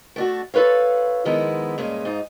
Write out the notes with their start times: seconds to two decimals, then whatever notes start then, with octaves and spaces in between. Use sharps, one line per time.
0.16 A3 D4 F#4
0.54 F4 A4 B4 C#5 F5
1.25 D#3 F3 G#3 B3 E4
1.78 G2 A#2 G#3 C#4
2.05 G#2 D#4 F4